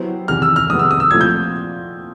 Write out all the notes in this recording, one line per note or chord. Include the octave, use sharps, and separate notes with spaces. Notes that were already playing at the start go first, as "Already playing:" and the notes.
Already playing: F#3 B3 E4 G4 C5
E2 C3 D#3 F6
E6
F6
F2 C3 D#3 G#3 B3 D#6
E6
D#6
E6
A#2 F3 A3 C4 F4 G#6
G6